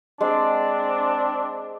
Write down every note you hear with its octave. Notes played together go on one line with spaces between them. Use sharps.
G#3 C4 D4